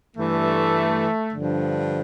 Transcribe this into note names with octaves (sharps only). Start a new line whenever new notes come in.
G2 E3 A3
G2 D3 F3